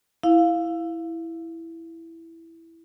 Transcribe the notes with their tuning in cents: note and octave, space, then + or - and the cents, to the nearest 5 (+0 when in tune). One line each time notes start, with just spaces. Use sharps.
E4 +0 F5 +0